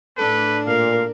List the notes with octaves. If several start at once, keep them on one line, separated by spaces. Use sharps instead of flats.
A2 D4 A4 B4
A#2 A#4 F5